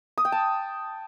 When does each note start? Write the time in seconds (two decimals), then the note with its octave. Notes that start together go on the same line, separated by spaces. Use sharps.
0.18 D#6
0.25 G5
0.32 A5